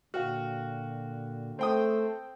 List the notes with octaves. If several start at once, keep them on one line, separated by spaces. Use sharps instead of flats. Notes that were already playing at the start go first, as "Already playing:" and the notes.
A#2 D3 F#4 F5 G5 F6
A3 C4 A4 C5 G5 D#6